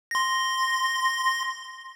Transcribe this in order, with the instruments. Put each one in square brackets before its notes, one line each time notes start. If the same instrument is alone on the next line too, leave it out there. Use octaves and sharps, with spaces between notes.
[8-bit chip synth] C6 A#6